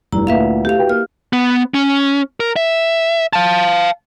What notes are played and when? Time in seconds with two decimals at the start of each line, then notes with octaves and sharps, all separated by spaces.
0.12 F1 G2 E4 A#5
0.27 D2 A#2 B4 E5 F5
0.65 A3 G4 F5
0.78 F#4 B4 G5
0.89 A#3 F6
1.33 B3
1.74 C#4
2.40 A#4
2.56 E5
3.33 F5 A5